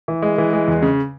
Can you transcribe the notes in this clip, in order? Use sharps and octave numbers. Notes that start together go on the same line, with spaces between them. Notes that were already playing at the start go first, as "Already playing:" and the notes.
E3
G#3
E3
G#3
E2
C#3